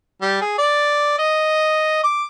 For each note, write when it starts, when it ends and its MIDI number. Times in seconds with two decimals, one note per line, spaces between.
0.22 0.40 55
0.41 0.56 68
0.58 1.16 74
1.19 2.01 75
2.04 2.24 86